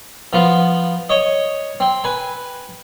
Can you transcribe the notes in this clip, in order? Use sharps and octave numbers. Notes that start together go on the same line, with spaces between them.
F3 B3 F4
C#5 D#5
C4
B4 G#5